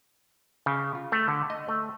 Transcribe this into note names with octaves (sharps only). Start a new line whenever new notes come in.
C#3
F4
A3
D3
D#5
A3